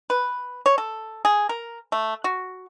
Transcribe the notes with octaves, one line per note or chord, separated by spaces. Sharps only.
B4
C#5
A4
G#4
A#4
A3
F#4